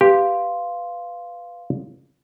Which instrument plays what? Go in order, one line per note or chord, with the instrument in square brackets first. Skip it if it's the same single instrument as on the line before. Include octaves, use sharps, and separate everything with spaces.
[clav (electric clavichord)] G4 [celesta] B4 F5 C6